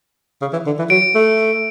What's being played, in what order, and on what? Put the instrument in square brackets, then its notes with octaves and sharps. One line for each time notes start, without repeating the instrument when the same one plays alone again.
[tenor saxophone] C#3
E3
D3
E3
[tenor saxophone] F#3 [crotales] D7
[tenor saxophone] A3